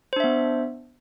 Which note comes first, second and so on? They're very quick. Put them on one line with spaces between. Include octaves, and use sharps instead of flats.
C5 D4 E5 B3